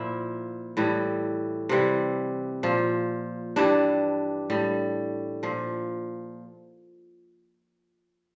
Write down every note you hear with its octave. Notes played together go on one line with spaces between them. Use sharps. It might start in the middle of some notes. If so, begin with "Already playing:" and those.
Already playing: A#2 F3 E4
A2 E3 G3
C3 E3 G3
A#2 F3
G2 E3 G3 D4
A2 G3
A#2 F3